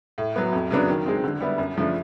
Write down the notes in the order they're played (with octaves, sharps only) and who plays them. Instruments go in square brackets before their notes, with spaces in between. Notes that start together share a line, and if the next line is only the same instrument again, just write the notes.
[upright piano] A2
F#3 B3
F2
C#3 F#3 B3 D4
D#3
G#3 C4
D3
G3 B3 E4
F#2
C#3 F3 A3 D4